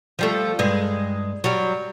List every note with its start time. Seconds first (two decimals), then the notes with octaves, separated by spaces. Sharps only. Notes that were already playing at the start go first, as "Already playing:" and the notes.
0.19 F3 G3 A3
0.59 G2 G#3
1.44 F#3 G3